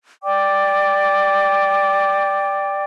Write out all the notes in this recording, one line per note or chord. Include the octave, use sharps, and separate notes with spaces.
D5 G5 D6